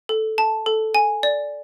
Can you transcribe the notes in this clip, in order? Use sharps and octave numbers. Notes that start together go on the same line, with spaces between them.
A4
A5
A4
G#5
D5